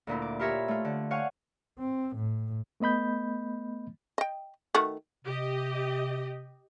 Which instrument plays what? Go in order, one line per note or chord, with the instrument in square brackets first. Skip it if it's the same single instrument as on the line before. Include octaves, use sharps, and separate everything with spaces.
[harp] D2 A#2 E4
D6
E4 F4 G4 A#4 C#5 E5
A3 F4
D3
C#5 F5 F#5 G#5 C#6
[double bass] C4
A2
[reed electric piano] A3 B3 D#5 B5 G6
[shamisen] D#5 G5
D#3 A3 F#4
[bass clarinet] C3 [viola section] G4 D#5